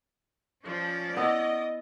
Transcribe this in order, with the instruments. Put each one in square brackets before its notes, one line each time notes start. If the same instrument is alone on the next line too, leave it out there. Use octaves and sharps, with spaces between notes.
[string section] F3 [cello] C#4 D5
[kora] B3 E4 [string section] D#5